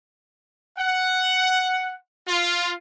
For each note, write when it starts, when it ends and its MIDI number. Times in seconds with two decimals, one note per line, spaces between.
0.78 1.94 78
2.28 2.72 65